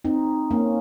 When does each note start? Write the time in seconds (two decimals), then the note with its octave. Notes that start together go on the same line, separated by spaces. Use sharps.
0.04 C4 D#4
0.51 A#3 C#4